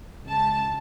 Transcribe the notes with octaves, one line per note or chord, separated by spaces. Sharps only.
C#2 A5